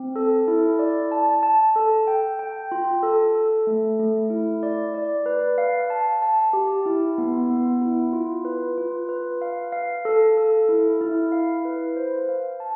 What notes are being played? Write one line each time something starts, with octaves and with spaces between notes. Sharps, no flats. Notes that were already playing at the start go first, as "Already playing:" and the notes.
Already playing: C4
A4
E4
D5
A5
A5
A4
G5
G5
F4
A4
A4
A3
A3
E4
D5
D5
B4
F5
A5
A5
G4
E4
B3
B3
E4
F4
B4
F4
B4
F5
F5
A4
A4
E4
E4
F5
B4
C5
F5
A5